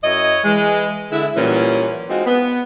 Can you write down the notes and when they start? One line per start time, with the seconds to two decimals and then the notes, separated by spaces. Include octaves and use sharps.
0.03 F#2 E4 C#5 D#5
0.44 E3 G#3
1.11 D3 G#3 E4
1.35 A#2 E3 F#3 G3 C#4
2.08 G#3 C4 D#4 F4 F#4
2.26 B3